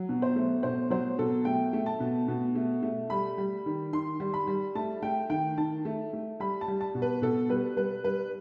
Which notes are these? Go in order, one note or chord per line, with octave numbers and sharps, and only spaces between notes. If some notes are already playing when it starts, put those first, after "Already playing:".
Already playing: F#3
B2
C5
A3
B2 C5
F#3 C5
B2 A4
A3 G5
A3
A5
B2
B2
A3
A3
G3 B5
G3
D#3
D#3 C6
G3
B5
G3
A3 A5
A3 G5
D#3 G5
D#3 A5
A3
A3
G3 B5
A5
G3
A5
B2
B4
B2 A4
G3 B4
G3 B4
G3 B4